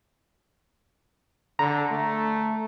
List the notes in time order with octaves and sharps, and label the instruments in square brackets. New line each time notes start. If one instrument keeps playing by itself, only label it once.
[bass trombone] D3 [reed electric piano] A#5
[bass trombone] A3